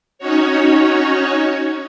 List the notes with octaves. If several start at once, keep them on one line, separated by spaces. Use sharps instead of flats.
C#4 D#4 F#4 C#5